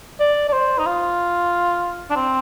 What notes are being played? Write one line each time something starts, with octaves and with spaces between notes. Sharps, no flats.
D5
D5
C5
D#4
F4
D4
C4